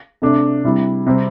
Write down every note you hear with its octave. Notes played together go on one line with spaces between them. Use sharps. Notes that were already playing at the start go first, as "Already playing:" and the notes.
C3 A3 D4
C3 G3 E4
C3 G3 C4